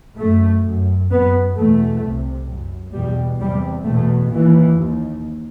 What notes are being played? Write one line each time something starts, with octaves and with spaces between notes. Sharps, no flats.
F#2 A3
F#2
F#2 B3
E2 B2 A3
C2 C3
F#2
E2 B2 G3
E2 C3 G3
E2 B2 A3
D#2 E3
D#2